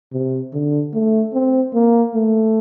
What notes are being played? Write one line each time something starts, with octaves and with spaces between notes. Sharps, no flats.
C3
D3
A3
C4
A#3
A3